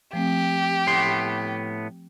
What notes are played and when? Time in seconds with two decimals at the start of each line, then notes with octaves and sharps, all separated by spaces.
0.13 F3 A3 C4 G4
0.87 A2 B3 C6